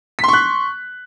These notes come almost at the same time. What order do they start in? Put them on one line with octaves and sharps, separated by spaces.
B6 C6 C#6 F#6